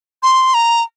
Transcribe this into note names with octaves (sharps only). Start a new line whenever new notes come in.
C6
A#5